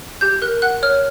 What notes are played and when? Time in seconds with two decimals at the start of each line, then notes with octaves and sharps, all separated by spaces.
0.21 G4 G6
0.42 A#4 F#6
0.62 F#5 F#6
0.83 C#5 F6